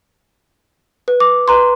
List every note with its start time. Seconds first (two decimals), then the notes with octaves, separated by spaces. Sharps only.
1.08 B4
1.20 D6
1.48 B4 A#5 C6